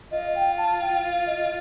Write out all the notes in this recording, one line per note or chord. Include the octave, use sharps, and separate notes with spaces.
F4 D#5
G5
A5
G5
F5
D#5